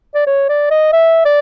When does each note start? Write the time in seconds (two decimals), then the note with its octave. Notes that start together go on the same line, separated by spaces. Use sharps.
0.15 D5
0.27 C#5
0.49 D5
0.71 D#5
0.93 E5
1.25 D5